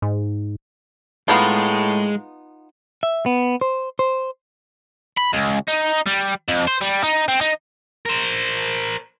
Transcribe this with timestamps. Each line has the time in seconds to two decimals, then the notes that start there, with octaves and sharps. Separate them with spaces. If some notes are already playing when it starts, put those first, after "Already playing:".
0.02 G#2
1.28 A2 G#3 B3 D#4 F4
3.03 E5
3.26 B3
3.61 C5
3.99 C5
5.17 B5
5.33 C#2
5.68 D#4
6.06 G3
6.49 F2
6.68 C5
6.81 G3
7.04 D#4
7.28 C4
7.41 D#4
8.06 A#4 C5